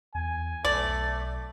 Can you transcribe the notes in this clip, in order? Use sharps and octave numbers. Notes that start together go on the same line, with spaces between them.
E2 G#5
B1 A3 D5